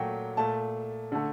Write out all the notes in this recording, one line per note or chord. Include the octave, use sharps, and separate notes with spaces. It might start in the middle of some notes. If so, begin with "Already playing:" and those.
Already playing: A#2 F#3 A3 G5
A#2 A3 A5
D3 A3